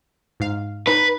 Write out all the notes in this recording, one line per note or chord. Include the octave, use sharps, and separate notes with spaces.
G#2 F5
D#4 B4